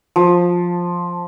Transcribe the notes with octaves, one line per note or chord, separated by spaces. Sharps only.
F3